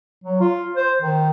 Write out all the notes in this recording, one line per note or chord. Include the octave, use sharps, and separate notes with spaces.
F#3
F4
C5
D#3